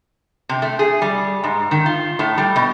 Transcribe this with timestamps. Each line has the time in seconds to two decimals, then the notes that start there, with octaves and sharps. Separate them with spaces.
0.49 C3
0.62 A3
0.79 G#4
1.02 G3
1.44 G#2
1.71 D#3
1.86 F4
2.19 A2
2.38 G3
2.56 B2